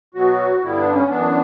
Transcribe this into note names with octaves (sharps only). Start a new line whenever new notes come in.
B2 F#3 B3 F#4
G2 D3 G3 B3 E4
D4
C#4
F#2 E3 B3 D4